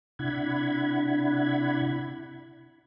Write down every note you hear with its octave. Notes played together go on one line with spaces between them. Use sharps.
C3 D4 E4 F#5 B5 G#6